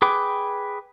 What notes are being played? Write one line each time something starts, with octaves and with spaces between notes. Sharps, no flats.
G#4 B4 G5 D6